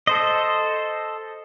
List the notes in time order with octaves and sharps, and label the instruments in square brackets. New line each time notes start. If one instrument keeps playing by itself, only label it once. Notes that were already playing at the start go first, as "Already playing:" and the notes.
[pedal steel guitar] A4 C5 D#5